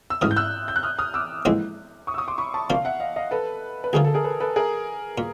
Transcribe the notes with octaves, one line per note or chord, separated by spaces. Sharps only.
E6
A1 G#2 E3 D#6 F6
G6
E6 F#6
G6
F#6
D#6 F6
D#6 F6
D6 E6
A#1 A2 E3 G#3 C4
C#6 D#6
E6
C#6 D#6
C6 D6
B5 C#6
A5 B5
C3 F3 A#3 D4 F5
E5 F#5
D#5 F5
D#5 F5
A4 B4
B4
D2 D3 F3 G#4 A#4
A4
G#4 A#4
A4 B4
A4 B4
G#4 A#4
A#2